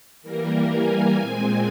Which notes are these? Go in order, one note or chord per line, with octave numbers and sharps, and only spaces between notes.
E3 G3 A#3 A#4
G#5
A#2 G#3 C4 G#5